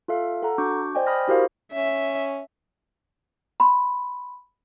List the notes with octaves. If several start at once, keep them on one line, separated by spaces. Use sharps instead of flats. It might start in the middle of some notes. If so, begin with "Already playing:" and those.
F4 A4 E5 F5
A4 F#5 A#5
D4 F#4 C#6 D6 G6
C5 D5 D#5 G5 G#5
B5 D#6 F6 A#6
E4 F#4 G4 A#4 C5 F5
C#4 E5
B5 C6